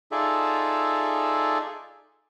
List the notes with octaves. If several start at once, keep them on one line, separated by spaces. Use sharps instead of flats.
D#4 F4 G#4 A4 D5 E5